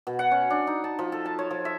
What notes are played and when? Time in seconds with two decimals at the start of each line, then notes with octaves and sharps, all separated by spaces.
0.07 B2
0.19 F#5
0.31 C#4
0.50 D4
0.67 D#4
0.84 A5
0.99 F3
1.12 A4
1.26 A5
1.39 C#5
1.51 F3
1.65 E5